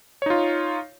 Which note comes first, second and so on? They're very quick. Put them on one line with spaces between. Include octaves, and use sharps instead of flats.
C#5 D#4 F4